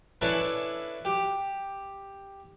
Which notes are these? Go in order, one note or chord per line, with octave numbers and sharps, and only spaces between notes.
C#4 D4 E4 A4 B4
G4